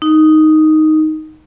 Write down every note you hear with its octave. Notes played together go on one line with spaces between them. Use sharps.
D#4